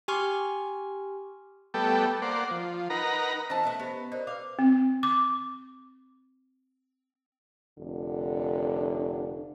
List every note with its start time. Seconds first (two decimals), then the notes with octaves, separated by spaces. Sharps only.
0.08 G4 G#5 C6 C#6 F6
1.74 G3 A3 B3 A4 G5
2.22 A#3 C5 D5 F#5
2.51 F3
2.90 D#4 A#4 B4 F#5 A#5
3.50 E3 C#4 C5 D#5 A5
3.64 A3 B3 E5
3.80 B3 G4 E5
4.12 D#4 A#4 C5 D5
4.27 B4 D5 F5 D6
4.59 C4
5.03 D6
7.79 F1 D3